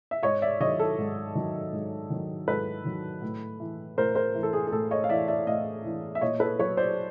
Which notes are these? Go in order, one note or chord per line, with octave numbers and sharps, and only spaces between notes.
E5
G#2 C#5 D#5
D5 E5
D#3 F#3 C#5 D#5
A4
G#2
D#3 F#3
G#2
D#3 F#3
G#2 A4 B4
D#3 F#3
A2
E3
A2 A#4 C5
A#4 C5
E3
A4
G#4
G#4
A2 A4
C#5 D#5
F5
E3 D5 E5
D5 E5
A2 D#5 F5
E3
E5
A#2 C#5 D#5
A4 B4
F#3 B4 C#5
C5 D5